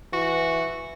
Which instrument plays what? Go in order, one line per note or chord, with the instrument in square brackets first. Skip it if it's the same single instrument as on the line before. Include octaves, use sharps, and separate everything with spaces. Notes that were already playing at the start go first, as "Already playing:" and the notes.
[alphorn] E3 [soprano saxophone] F#4